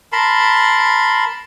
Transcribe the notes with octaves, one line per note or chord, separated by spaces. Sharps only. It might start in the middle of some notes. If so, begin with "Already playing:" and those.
A#4 A5 B5 C6